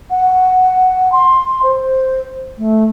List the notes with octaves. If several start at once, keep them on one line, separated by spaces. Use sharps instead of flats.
F#5
C6
C5
A3